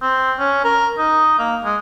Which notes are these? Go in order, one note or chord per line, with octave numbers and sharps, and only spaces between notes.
C4
C#4
A#4
D#4
A#3
G#3